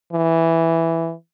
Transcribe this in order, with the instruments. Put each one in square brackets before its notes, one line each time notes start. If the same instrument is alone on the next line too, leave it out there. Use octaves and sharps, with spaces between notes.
[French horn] E3